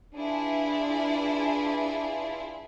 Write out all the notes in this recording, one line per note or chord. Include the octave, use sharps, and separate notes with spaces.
D4 E4 F4 G#4 B4